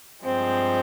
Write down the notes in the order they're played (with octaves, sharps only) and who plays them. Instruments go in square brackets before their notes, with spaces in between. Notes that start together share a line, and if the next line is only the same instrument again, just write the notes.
[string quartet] G2 F3 G#3 C4